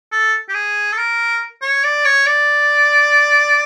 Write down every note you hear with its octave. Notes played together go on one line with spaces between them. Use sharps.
A4
G4
G#4
A4
A#4
C#5
D5
C#5
D5